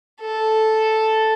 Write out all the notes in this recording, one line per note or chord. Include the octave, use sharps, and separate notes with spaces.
A4